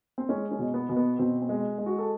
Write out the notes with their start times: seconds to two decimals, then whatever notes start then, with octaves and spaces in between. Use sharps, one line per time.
0.18 C4
0.29 G#3 C#4
0.51 C#4
0.59 B2
0.74 B3
0.89 B2
0.96 B3
1.19 B2 C4
1.42 C4
1.49 G#3
1.78 G#3
1.86 F#4
1.99 A4